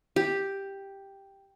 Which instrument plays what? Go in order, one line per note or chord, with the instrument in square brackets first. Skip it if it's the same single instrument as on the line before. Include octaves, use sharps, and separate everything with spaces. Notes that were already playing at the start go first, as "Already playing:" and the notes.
[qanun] G4